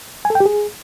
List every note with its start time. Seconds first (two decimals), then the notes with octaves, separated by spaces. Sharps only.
0.25 G#5
0.30 A4
0.35 G5
0.40 G4
0.46 G#4